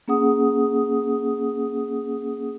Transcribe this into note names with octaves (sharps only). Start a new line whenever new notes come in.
A#3 C#4 G#4 F#5 D#6